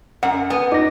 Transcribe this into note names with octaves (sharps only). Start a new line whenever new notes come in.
F#2 F#5
B3 G#5
D#4 D6 A#6